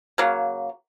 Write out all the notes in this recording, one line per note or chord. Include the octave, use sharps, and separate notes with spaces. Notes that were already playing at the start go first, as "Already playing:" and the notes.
C#3 F#3 A#3